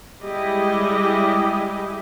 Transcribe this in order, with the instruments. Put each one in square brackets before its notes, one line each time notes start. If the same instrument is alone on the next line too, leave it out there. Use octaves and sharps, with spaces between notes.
[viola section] G3 G#3 E4 G4 D#5